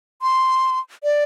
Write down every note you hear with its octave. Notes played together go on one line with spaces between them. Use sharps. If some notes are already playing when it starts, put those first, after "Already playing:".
C6
D5